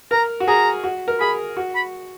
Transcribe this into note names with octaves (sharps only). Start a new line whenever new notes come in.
A#4 A#5
F#4
G#4 A#5
F#4
A#4
G#4 B5
F#4
B5